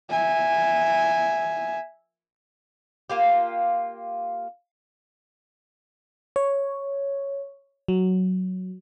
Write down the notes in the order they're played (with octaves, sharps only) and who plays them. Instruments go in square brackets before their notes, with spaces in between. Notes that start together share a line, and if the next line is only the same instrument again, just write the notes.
[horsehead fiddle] E5 G#5
[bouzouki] A#3 F4 G4
[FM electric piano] C#5
F#3